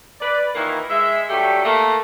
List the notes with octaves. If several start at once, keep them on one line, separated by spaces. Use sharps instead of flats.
B4 D5
A#2 D#3 E3 A#3 E4
G#3 E5
D3 F#3 G3 A3 G4 G5
A3 A#3